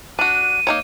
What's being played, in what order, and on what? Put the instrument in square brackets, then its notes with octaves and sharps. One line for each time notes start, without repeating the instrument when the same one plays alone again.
[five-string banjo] D4 F#4 [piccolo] D#7
[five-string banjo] A#3 D#4 C#5